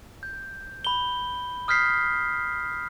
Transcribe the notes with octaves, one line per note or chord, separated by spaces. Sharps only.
G6
B5 G7
D#6 F6 G6 B6 C7